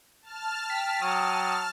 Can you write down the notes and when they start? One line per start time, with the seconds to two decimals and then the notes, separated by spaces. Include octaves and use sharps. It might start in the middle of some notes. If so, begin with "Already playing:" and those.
0.22 A5 F6
0.70 G5 B6
1.02 F#3 D#6